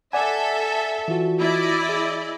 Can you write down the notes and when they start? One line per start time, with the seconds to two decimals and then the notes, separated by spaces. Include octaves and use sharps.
0.13 A4 D5 E5 F#5 G#5
1.08 E3 F4 F#4
1.39 E4 D5 D#5
1.89 G#4